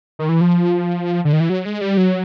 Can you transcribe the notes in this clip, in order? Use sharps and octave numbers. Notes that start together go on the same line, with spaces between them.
D#3
E3
F3
D3
D#3
E3
F#3
G#3
G3
F#3